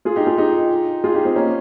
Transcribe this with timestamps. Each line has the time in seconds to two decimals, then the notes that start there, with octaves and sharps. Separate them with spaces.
0.05 F4 G#4
0.16 D#4 G4
0.27 F4 G#4
0.37 D#4 G4
1.04 F4 G#4
1.14 D#4 G4
1.25 C4 D#4
1.35 A#3 C#4